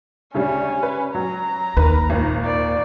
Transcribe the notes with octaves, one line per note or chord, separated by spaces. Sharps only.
D2 C#3 G3 C#4
B4
F#3 A#5
D#2 A#4 B4
G#1 A#2
D5